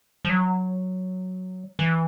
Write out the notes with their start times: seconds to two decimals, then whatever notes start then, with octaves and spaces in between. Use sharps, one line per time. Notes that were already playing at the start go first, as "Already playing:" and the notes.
0.25 F3
0.29 F#3
1.79 E3